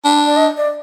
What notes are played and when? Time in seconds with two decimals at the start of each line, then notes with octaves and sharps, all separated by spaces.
0.05 D4
0.26 D5
0.37 D#5
0.57 D5